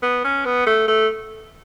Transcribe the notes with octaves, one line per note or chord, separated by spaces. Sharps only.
B3
C#4
B3
A3
A3